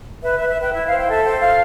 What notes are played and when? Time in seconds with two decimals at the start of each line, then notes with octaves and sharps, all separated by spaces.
0.23 B4 E5
0.35 B4 E5
0.49 E5
0.57 B4 G5
0.73 E4 E5
0.86 C5 F5
0.99 G5
1.06 A4 E5
1.24 C5 G5
1.40 F4 F5